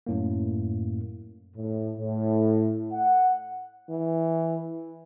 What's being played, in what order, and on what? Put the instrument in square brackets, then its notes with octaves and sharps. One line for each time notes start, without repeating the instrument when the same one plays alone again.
[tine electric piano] F#2 A2 A#3
[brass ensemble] A2
A2
F#5
[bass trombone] E3